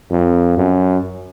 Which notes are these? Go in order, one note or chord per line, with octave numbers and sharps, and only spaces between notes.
F2
F#2